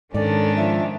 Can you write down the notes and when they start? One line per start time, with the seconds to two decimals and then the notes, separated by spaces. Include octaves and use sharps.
0.14 G#2 D#3 C#4 D4 A4 D5
0.57 F3 E5